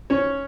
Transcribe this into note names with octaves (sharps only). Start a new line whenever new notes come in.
C#4 C#5